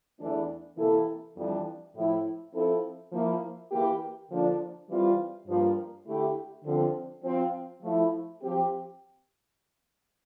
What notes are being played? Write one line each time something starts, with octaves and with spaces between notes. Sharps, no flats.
E2 E3 A3 D4
C3 E3 A#3 E4 A4
F2 E3 G3 D4
A2 F3 A3 E4
F3 C4 E4 A4
F3 A#3 E4
E3 A#3 E4 G4
D3 F3 A#3 D4 F4
E3 G3 C4 F4
G2 F3 A#3
D3 A3 E4 G4
D3 F3 C4
F3 C4 F4
F3 A3 E4
F3 C4 G4